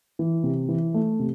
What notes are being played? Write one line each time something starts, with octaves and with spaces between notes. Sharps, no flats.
E3
C3
E3
A3
C3